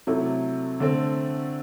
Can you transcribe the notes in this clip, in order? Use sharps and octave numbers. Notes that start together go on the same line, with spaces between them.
C3 F#3 A3 E4
D3 A3 C4